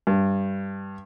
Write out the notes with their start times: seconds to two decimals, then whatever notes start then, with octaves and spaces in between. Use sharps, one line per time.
0.07 G2